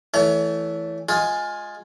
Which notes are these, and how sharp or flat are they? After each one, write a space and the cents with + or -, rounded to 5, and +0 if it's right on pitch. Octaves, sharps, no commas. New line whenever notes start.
E3 +0 A3 +0 C#5 +35
G#3 +0 F4 +20 G#4 +0